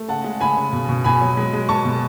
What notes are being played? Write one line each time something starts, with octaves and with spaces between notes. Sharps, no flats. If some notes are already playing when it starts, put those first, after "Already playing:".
Already playing: A3
C#3 F#5 A5
G#3
C#3 G#5 B5
C#3
B2
B2
B2 G#5 B5
F#3
G#3
G#3
G#3 A5 C#6
B2